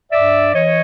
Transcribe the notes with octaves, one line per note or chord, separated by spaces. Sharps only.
G2 D5 E5
E3 C#5 D#5